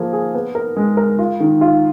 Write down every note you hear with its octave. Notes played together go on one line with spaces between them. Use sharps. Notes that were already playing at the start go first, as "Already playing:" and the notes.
Already playing: F3 A#3 G#4
G#4
B3
A#4
G#3
A#4
F4
D#3
F4